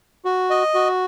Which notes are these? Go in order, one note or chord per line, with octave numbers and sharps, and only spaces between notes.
F#4
D#5
F#4